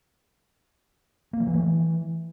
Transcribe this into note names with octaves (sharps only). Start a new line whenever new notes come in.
A#3
F3
E3
A3
E3